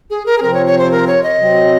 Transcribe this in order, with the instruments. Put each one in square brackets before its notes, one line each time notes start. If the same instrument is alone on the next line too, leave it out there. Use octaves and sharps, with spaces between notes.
[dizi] G#4
A#4
G#4
[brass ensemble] C3 F3 C4 [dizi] A#4
[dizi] C#5
C#5
C5
A#4
C#5
D#5
[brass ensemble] C3 F#3 C4